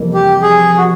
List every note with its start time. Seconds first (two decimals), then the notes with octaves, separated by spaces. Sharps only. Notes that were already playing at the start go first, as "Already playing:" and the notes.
Already playing: F2 C3 E3 G3 A#3
0.14 G4
0.42 G#4
0.78 F#4